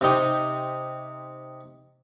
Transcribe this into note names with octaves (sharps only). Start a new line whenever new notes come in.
C3 C4 D#4 G4